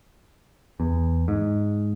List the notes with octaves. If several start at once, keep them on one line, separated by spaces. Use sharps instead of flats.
E2
G#2